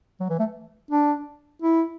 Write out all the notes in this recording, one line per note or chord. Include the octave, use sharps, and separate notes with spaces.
F#3
E3
A3
D4
E4